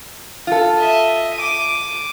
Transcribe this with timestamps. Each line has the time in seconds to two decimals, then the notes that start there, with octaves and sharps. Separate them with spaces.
0.47 F4 A4
0.77 D#5 E5
1.35 D6 D#7